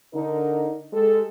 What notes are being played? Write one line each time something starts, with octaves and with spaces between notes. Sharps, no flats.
D3 D#4 A#4
G#3 G4 A4